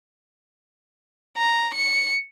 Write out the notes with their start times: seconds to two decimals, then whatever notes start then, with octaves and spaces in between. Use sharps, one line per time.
1.38 A#5
1.74 C#7